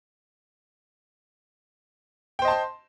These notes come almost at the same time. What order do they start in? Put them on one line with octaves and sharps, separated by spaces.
G5 C5 D#5 A5 C6